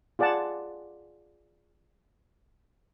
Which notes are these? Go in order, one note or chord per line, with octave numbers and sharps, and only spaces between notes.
F4 G#4 D5 F#5 A5